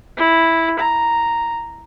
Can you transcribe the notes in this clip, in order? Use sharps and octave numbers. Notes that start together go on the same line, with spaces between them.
E4
A#5